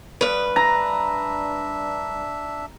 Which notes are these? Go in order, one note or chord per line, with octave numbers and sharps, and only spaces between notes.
G2 B4 D#6
D4 E5 A#5